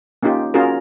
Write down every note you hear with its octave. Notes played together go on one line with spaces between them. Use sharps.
A#3 C#4 D#4 F4 G4
C#4 F4 F#4 G#4 A#4